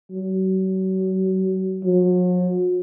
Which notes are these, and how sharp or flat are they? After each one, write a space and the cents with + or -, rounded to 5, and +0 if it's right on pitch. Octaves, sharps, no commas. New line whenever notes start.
F#3 +35
F#3 -45